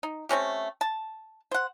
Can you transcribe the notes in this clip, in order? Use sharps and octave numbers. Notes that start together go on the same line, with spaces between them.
D#4
A3 C4 C#4 G4
A5
C5 F#5